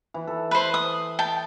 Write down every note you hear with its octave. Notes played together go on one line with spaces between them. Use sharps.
E3
A4
B4 C5
D#6
G5 A5